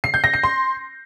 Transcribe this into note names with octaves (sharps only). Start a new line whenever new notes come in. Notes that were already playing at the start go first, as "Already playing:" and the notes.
C7
G6
A#6
C7
C6